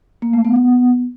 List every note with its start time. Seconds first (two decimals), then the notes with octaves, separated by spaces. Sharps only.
0.22 A#3
0.33 A3
0.45 B3
0.56 B3